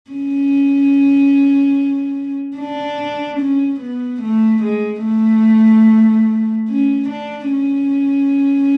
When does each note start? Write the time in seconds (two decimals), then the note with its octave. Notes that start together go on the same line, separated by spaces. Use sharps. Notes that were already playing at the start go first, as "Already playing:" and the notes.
0.11 C#4
2.57 D4
3.40 C#4
3.80 B3
4.22 A3
4.63 G#3
5.04 A3
6.69 C#4
7.09 D4
7.51 C#4